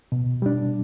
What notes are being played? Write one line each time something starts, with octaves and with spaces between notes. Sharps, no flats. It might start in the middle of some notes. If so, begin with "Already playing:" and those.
B2
G3 D4